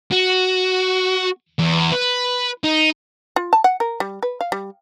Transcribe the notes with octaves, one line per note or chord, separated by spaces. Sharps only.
F#4
E2
B4
D#4
F4
A5
F#5
A#4
G3
B4
F5
G3